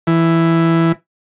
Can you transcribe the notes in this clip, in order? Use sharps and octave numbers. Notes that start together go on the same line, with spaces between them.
E3